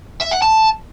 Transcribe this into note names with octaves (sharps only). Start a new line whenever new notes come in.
E5
F#5
A5